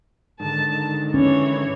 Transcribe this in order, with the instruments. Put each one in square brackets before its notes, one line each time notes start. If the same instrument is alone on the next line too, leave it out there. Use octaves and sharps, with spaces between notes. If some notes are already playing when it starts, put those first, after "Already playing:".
[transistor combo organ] G#2 D3 D#3 [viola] A5
[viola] E3 C#5 [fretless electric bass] C#4